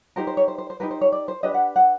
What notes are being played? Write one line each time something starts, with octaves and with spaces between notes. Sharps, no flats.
D#4 G4 A#4 C5
C5
C#5
C5
C5
C5
D#4 G4 A#4 B4
C5
C#5
D5
C5
D4 G4 B4 D#5
F#5
F#5